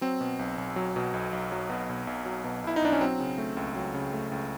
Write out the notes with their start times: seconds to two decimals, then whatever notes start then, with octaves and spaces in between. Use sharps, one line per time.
0.01 F#3 C4
0.21 B2
0.39 B1
0.58 B1
0.76 F#3
0.96 B2
1.14 B1
1.33 B1
1.52 F#3
1.70 B2
1.89 B1
2.07 B1
2.26 F#3
2.44 B2
2.64 B1 E4
2.76 D#4
2.82 B1 D4
2.92 C#4
3.01 F#3 C4
3.20 C#3
3.38 A3
3.57 C#2
3.76 F#3
3.94 C#3
4.13 A3
4.32 C#2